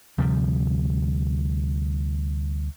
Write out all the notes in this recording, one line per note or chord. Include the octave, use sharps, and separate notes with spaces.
D2 C3 F3 G3